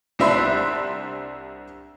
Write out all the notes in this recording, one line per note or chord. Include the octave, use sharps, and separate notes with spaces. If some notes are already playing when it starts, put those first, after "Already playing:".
C2 C4 D4 E5 B5 C6